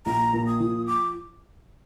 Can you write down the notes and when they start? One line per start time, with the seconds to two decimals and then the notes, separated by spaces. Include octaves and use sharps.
0.06 A#1 A#5
0.33 A#2
0.47 D#6
0.60 F3
0.87 D6